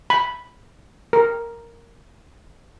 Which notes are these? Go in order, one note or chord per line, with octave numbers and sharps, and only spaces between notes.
B5
A#4